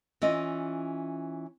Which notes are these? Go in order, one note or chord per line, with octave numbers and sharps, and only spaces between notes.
E3 C#4 F4 D#5